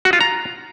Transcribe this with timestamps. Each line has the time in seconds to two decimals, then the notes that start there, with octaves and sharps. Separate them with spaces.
0.05 F#4
0.13 F4
0.21 A#5